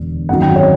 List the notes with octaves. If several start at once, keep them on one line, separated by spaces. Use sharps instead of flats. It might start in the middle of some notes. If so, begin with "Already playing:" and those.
Already playing: E1 D3
G#1 F#2 D#3 F#3 F#5
G5
C#5